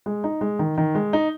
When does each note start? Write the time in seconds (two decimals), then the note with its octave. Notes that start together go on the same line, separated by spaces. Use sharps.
0.06 G#3
0.24 D#4
0.41 G#3
0.59 D#3
0.78 D#3
0.95 G#3
1.13 D#4